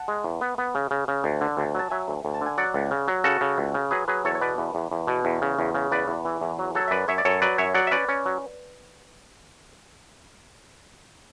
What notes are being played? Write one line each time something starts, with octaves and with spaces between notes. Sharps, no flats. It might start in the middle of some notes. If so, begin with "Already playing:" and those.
Already playing: F#5 A5
G#3
E2
B3
B3
C#3
C#3
C#3
D2
D3
D2
F#3 A5
F#3 E5 G#5
D2
D2
A5
D3 G#5
F#3 D5 F#5
C#2
C#3
F#3
C#3 F#4 A4
C#3
C#2
C#3
F#3 G#4 B4
F#3 G#4 B4
E2 A4 C#5
C#5
B2 B4 D5
E2
E2
E2
B2
E2
C#3
E2
C#3
E2 B4 D5
E2
E3
E2
F#3
F#3 A4 C#5
E5
F#2 B4 D5
F#2 C#5 E5
D5
F#2 A4 C#5
F#3 B4 D5
F#2 C#5 E5
F#3 D5 F#5
E5
C#4 B4 D5
C#4
F#3